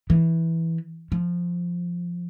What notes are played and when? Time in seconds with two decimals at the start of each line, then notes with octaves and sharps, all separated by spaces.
0.10 E3
1.12 F3